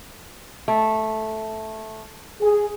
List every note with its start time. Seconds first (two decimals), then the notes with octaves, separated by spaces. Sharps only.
0.68 A3
2.41 G#4